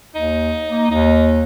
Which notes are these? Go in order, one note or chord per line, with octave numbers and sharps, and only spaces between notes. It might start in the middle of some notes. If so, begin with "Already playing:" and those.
D#2 D#4
A#3
D#2 D#4